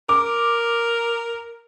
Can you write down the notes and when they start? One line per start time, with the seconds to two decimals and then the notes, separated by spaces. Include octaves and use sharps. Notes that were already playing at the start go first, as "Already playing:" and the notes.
0.09 A#4 D6